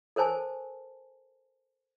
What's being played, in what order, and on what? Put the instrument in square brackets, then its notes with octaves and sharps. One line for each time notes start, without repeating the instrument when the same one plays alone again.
[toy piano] A4 A#4 C5 G#5 A5